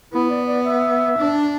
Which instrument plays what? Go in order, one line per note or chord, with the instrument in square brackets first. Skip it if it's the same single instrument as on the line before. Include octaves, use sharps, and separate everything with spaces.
[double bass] B3 [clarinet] E4
[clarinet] D5
D5
E5
[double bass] D4